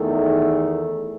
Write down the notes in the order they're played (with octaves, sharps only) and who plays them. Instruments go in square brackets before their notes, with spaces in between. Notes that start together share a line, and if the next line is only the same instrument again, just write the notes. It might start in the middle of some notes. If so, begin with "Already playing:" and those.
Already playing: [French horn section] E2 D#3 A3